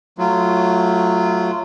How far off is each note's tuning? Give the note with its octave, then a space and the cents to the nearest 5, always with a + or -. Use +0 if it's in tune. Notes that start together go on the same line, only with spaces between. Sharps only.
F#3 +0 A3 +0 F4 -20